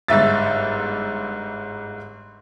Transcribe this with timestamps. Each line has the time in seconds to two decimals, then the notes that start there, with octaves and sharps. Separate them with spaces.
0.08 G1 G#2 E5 A6